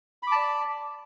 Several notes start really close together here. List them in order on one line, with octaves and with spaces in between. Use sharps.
B5 D6 A5 D5